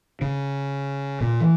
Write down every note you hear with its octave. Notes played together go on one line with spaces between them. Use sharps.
C#3
A#2
E3